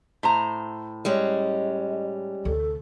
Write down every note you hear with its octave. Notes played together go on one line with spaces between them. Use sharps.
A2 C5 A#5
G3 G#3 C#4 D#5
D2 C3 A4